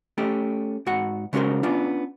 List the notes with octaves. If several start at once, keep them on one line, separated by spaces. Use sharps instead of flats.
A3 C#4 G4
G#2 F#4 F#5
C#3 G#3 C#4 F#4 A#4 C5
B3 C#4 D4 F4